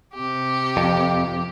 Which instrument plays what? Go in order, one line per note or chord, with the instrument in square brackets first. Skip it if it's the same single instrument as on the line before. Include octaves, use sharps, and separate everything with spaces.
[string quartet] C3 G4
[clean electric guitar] F2